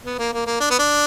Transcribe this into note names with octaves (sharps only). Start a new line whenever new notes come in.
B3
A#3
A#3
A#3
D4
B3
D4